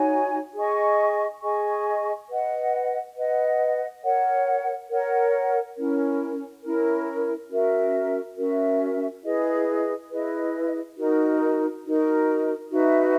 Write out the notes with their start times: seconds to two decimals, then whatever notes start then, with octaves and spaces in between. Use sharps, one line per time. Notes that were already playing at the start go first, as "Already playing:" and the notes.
Already playing: D#4 F#4 C#5 G#5
0.55 G#4 D#5 G#5 C#6
1.42 G#4 D#5 G#5 C#6
2.30 B4 D#5 F#5
3.17 B4 D#5 F#5
4.03 A#4 C#5 F#5
4.89 A#4 C#5 F#5
5.76 C#4 E4 A#4
6.63 C#4 E4 A#4
7.49 C#4 F#4 A#4 E5
8.37 C#4 F#4 A#4 E5
9.23 E4 G#4 B4 D#5
10.11 E4 G#4 B4 D#5
10.96 D#4 F#4 A#4
11.84 D#4 F#4 A#4
12.71 D#4 F#4 B4 E5